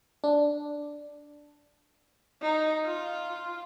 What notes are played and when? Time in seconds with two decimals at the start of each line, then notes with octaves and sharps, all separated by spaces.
0.24 D4
2.42 D#4
2.85 F4